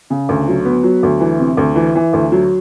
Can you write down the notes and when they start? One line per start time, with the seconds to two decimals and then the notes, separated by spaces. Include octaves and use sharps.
0.10 C#3
0.29 D2
0.48 F#3
0.65 B3
0.83 F#3
1.03 D2
1.20 E3
1.39 C3
1.57 D2
1.76 E3
1.95 E3
2.13 D2
2.32 F#3